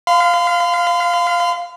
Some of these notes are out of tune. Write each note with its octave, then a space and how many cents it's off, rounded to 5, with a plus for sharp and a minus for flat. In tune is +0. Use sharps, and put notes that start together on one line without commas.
F5 +0 C6 -45